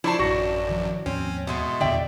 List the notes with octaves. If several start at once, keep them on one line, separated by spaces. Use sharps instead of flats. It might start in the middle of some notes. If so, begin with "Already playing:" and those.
F3 D4 E4 A5 C#6 C7
A1 F#2 F#4
D#3 F3
D#2 G#2 F3 C4 C#4
B2 E3 G#3 A3
E2 A#2 D3 D5 E5 G5